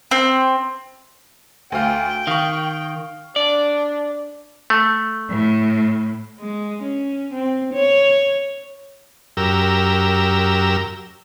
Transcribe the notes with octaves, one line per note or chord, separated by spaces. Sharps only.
C4
D2 F5 G5
D#3 F5 C#6
D4 D5
A3
A2
G#3
C#4
C4
C#5
F#2 G4 A#4 E6